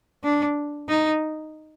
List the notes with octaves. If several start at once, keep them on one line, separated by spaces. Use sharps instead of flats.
D4
D#4